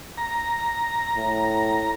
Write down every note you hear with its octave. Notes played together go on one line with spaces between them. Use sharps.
A#5
A2